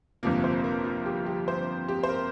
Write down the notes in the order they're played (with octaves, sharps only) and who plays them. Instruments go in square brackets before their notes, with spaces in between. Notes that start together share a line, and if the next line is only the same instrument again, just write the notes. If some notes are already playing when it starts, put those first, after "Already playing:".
[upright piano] G1 F2 C3 F3 A#3 A#4
C5
A#4
F4
G4
G4
C5
G4
C5
A#4